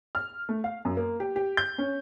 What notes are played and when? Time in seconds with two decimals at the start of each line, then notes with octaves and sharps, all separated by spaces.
0.15 F6
0.49 A3
0.64 F5
0.85 F#2
0.97 A#3
1.20 G4
1.36 G4
1.57 G6
1.78 C#4